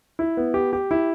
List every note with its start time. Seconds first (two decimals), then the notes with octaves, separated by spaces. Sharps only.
0.19 E4
0.37 B3
0.54 G4
0.73 G4
0.91 E4